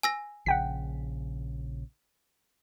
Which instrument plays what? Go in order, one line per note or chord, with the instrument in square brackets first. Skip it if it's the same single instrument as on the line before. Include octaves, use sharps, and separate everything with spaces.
[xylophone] G#5 E6 A#6
[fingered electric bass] A#1 C#3 [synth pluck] F#5 G5 B6